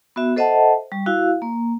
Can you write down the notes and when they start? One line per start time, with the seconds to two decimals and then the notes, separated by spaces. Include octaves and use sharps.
0.16 B3 F#4 E5
0.36 A4 C5 D#5 E5 F#5 A5
0.92 G3
1.06 E4 F#4 F5
1.42 A#3